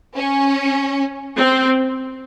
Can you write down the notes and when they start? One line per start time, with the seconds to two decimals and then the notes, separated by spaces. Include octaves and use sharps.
0.16 C#4
1.37 C4